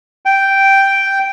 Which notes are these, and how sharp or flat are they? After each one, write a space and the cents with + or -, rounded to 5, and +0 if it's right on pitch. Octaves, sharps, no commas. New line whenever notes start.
G5 -5